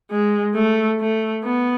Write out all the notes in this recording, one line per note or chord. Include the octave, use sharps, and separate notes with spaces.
G#3
A3
A3
B3